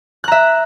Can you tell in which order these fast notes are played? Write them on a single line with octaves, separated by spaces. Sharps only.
F#6 A#5 E5